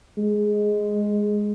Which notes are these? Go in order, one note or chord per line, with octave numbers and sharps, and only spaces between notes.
G#3